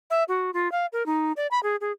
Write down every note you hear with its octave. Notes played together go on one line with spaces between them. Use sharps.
E5
F#4
F4
F5
A#4
D#4
D5
B5
G#4
G#4